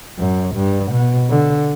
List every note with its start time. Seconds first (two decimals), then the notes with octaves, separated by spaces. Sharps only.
0.19 F#2
0.55 G2
0.92 B2
1.30 D3